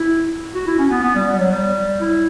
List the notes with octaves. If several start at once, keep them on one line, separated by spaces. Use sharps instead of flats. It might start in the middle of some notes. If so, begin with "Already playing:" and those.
Already playing: E4
F#4
E4
C#4
B3
B3
G3
G3
F#3
G3
E4